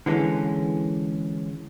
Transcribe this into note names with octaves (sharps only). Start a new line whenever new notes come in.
D3 E3 G#3 C4 C#4